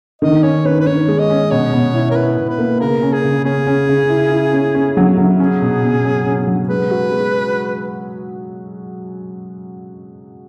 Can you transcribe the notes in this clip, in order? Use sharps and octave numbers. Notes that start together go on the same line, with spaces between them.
D#3 D#5
C#4 C#5
D#3 B4
B4
D#3 C#5
G#3
D#5
C#4
B2 C#5
B2
E4
A#4
E4 B4
B2
B4
A#3
C#3 A#4
C#4
G#4
C#3
C#4 G#4
C#4
C#3
E4
E4
C#4
C#4
F#3
F#3
C#4 G#4
B2
B2
C#4
C#4
F#3
G#3 B4
F#4
G#3